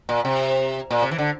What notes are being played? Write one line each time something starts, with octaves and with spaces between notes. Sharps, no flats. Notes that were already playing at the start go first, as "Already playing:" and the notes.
A#2
C3
A#2
C3
E3
D3